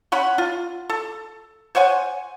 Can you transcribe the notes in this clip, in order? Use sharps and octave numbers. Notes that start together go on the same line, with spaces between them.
C#4 C#5 F#5 B5
F4
A4
C5 C#5 F#5 G#5